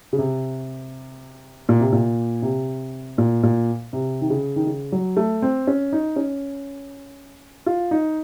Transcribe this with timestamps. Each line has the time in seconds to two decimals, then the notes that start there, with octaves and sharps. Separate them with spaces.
0.13 C#3
0.18 C3
1.69 A#2
1.80 C3
1.92 A#2
2.42 C3
3.18 A#2
3.43 A#2
3.93 C3
4.21 D#3
4.30 C#3
4.56 D#3
4.67 C#3
4.92 F#3
5.17 A3
5.42 C4
5.67 C#4
5.93 D#4
6.16 C#4
7.66 F4
7.91 D#4